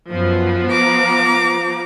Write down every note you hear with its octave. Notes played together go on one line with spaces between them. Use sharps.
F#2 F3 B3
A#5 D6